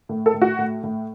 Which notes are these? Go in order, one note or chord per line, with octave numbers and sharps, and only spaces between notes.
A2
A4
A2
F#4
A2
A2